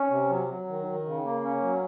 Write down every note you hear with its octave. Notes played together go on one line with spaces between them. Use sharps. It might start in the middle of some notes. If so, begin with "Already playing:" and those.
Already playing: C#4
C3
F#3
F#3
D#3
D#3
C#3
A#3
C#4
F#3